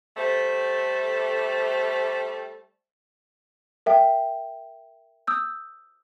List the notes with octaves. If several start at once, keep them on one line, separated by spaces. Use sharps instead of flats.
G3 A3 A4 C5
A#4 E5 G5
D#6 E6 G6